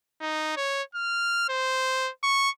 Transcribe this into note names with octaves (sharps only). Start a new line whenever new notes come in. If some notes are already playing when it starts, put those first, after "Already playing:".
D#4
C#5
F6
C5
C#6